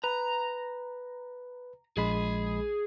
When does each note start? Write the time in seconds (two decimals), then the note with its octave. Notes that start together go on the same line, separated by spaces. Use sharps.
0.04 B4 A#5
1.97 A#1 G#3 G#4 B5